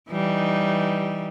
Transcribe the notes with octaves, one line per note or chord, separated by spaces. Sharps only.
E3 G3 D#4